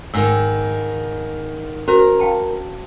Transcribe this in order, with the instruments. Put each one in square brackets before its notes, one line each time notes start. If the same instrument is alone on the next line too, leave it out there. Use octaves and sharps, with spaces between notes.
[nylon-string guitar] G#2 D#3 [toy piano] E6
[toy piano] C#4 F#4 C5 [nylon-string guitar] A#4
[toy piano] F5 G5 A5